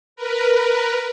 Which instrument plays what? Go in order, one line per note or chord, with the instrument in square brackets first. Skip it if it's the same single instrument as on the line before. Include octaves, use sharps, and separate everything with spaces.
[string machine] A#4 B4